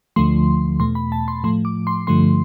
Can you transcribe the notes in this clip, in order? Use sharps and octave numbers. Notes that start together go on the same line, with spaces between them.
D2 D3 F3 A3 C6
E2 B2 A3 C6
B5
A5
C6
A2 F3 A3 C6
D6
C6
G2 D3 F3 A3 C6